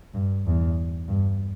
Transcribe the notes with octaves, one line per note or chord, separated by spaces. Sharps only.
G2
E2
G2